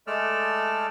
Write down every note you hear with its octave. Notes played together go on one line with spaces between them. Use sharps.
G#3 A3 A4 D5 E6 F6